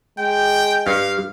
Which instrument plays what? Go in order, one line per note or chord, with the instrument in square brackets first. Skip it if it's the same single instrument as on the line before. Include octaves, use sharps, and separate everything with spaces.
[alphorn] G#3 [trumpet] G5
[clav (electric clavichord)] G2 [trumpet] F5